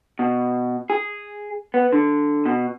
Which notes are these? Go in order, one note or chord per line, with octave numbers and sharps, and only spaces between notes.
B2
G#4
B3
D3
B2